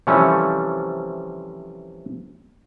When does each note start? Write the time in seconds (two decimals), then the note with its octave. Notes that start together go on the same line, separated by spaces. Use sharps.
0.07 C3 E3 F3 G3 A3 C#4